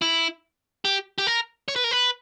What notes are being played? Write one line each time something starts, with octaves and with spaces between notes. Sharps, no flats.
E4
G4
G4
A#4
C#5
B4
A#4
B4